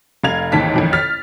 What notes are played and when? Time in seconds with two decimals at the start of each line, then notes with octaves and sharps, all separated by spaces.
0.24 F1 F5 G#6 F7
0.52 A1 D#2 G#2 A5 B6
0.74 A1 F2 D#3
0.93 F6 A6 B6